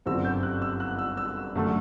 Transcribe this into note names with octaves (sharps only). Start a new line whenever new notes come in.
G1 F#2 D3 G3 C4 E6
G6
F#6
E6
F#6
E6
E6
F#2 D3 A3